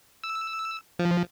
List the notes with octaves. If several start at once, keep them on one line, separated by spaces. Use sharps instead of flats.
E6
F3